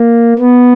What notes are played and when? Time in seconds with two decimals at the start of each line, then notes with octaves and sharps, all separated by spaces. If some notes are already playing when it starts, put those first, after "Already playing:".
Already playing: A#3
0.39 B3